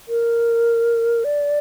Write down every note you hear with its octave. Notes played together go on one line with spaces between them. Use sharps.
A#4
D5